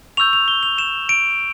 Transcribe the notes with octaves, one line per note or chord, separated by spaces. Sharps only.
C#6 E6 G6 F7
F7
G7
F7
E7
D7